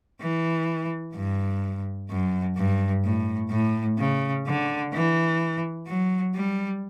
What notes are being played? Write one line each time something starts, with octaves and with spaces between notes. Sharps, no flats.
E3
G2
F#2
G2
A2
A2
C#3
D3
E3
F#3
G3